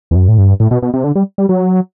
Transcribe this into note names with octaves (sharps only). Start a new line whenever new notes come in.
E2
F#2
A2
G2
A2
B2
B2
C3
D3
G3
G3
F#3